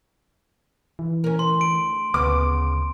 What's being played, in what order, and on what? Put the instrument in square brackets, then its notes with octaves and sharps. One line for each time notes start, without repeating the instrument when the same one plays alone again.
[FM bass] E3
[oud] C#4 A#4
[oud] D2 [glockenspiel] C6
[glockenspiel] D7
[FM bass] D2 [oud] C#3 B3 [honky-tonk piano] D6